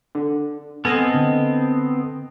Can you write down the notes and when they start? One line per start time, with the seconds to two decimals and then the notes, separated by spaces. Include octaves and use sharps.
0.15 D3
0.85 B3 C4 A4 D#5 G#5 A5 F6 G#6
1.14 D3